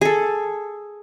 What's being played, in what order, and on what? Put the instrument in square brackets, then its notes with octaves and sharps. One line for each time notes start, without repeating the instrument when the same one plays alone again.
[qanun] G#4 A4